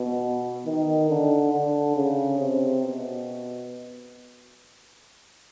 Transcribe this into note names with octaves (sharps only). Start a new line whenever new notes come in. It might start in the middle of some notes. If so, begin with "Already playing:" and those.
Already playing: B2
D#3
D3
D3
C#3
C3
B2